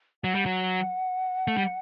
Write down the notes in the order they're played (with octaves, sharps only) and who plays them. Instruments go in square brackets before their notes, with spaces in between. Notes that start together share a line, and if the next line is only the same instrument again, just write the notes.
[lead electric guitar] F#3 [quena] F#5
[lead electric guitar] G3
F#3
A3
G3